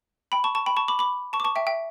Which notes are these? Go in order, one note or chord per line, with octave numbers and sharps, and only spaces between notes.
G5 B5
A5 C#6
A5 C#6
G5 B5
A5 C#6
B5 D6
B5 D6
A5 C#6
D6
A5 C#6
E5 G5
E5 G5